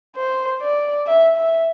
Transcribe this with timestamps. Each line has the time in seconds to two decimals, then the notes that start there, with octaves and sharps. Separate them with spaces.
0.16 C5
0.61 D5
1.07 E5
1.37 E5